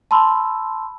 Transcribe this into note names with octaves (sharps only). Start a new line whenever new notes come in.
A5 B5 C6 E6